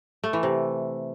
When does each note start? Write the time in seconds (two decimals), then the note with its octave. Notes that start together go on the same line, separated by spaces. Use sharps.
0.24 A3
0.33 E3
0.43 C3